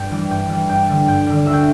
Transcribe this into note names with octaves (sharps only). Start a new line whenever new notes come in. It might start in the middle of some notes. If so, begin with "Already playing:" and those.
Already playing: G2 G5
E3 G3
G2 G5
E3 G3
G2 G5
D3 G3
G2 G5
D3 G3
D2 E5
G5